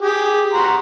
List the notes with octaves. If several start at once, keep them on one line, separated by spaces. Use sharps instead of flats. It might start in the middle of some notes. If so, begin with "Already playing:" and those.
G4 G#4
F#4 A#5 C6